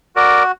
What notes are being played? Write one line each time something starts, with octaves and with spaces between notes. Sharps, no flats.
F#4 A#4 D5